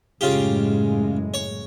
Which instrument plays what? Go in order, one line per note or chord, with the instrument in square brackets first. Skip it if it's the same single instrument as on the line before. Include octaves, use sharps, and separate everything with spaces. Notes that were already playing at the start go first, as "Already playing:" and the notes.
[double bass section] F#1 A2 G#3 [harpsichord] C#3 F4 G4
[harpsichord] C#5